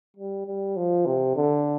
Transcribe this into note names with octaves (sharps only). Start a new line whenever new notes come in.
G3
G3
F3
C3
D3